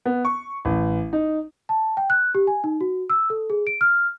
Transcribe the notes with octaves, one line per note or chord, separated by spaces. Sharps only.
B3
C#6
A1
D#4
A5
G5
F#6
G4
G#5
D#4
F#4
E6
A4
G#4
D7
F6